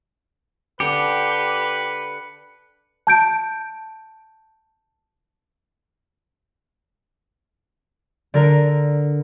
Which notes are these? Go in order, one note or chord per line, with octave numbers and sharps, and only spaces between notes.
D3 D4 G4 B4 C#7
A5 G6 D7
D3 A#4